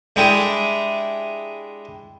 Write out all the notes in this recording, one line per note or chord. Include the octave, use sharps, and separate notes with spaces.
G#3 D4 E4 G4 G#4